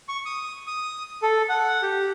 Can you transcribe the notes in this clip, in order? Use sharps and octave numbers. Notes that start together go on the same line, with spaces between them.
C#6
D#6
D#6
A4
F#5
G4